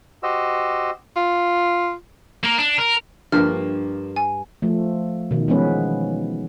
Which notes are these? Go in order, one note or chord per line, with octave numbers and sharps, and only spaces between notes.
F#4 G4 C5 D#5 E6
F4
A#3 A#4
D4
A#4
G2 D3 F3 A#3 F6
G#5
F3 A3
B2 D#3
E3 F3 G#3 B3 C#4 B4